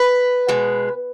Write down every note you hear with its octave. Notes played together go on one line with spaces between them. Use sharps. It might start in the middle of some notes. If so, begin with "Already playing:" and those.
Already playing: B4
B2 G#3